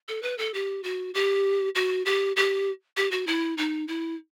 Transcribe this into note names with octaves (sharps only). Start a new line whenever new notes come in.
A4
B4
A4
G4
F#4
G4
F#4
G4
G4
G4
F#4
E4
D#4
E4